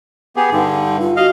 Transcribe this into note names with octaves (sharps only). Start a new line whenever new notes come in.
B3 G4 G#4
G2 D3 D#4
F4
F#4 D#5 F5